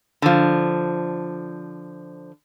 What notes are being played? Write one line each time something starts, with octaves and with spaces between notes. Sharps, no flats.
D3 F3